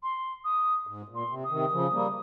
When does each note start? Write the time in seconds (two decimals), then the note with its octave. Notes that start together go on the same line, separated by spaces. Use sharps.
0.03 C6
0.45 D#6
0.87 G#2
1.08 A#2
1.15 C6
1.29 C3
1.44 D#6
1.50 C3 D#3
1.72 C#3 F3
1.92 G3 A#3